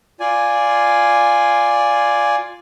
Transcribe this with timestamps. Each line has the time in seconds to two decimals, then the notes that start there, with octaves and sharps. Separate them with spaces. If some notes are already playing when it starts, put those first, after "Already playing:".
0.20 F4 D5 G#5